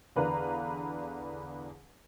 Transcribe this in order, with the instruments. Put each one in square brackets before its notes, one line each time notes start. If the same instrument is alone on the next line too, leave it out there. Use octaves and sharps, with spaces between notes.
[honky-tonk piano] E2 D3 B4 D5 F5 A#5